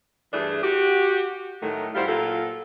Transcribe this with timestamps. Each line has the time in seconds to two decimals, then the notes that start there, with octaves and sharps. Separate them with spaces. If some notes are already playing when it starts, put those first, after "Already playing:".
0.33 G2 E3 A3 D4 G#4
0.62 F#4 G4
1.62 A2 D#3 F#3 A3
1.95 F#2 G3 E4 C5 F5 F#5
2.07 A#2 F#3 F4 A4